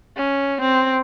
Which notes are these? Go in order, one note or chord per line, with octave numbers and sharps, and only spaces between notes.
C#4
C4